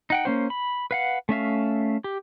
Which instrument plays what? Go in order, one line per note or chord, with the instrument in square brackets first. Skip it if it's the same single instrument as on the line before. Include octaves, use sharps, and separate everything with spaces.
[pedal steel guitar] D#4 F#5 G5
A#3 C#4 C5
B5
B4 F5 F#5
A3 C#4 E5 F5
G4